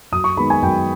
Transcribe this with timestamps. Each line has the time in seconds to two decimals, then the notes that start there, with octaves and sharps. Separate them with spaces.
0.12 F#2 D#6
0.24 C#6
0.37 D#3 G#3 B3 B5
0.50 G#5
0.62 F#2 G5